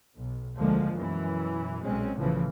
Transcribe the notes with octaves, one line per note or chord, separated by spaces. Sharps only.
B1
D2 D3 F3 G#3 A#3
F#2 B2 E3
B1 A#2 G#3 C4 C#4
B1 A2 C#3 E3 F3